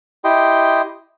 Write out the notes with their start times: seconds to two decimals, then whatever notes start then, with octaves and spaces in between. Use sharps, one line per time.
0.24 E4 G4 D#5 G5 C6